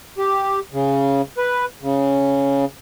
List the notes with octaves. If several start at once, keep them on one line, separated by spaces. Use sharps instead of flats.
G4
C#3
B4
C#3